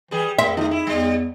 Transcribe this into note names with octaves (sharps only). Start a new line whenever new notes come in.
E3 G3 G#4
F2 A#3 E5 C6
F3 A3 D#4
E4
E2 G3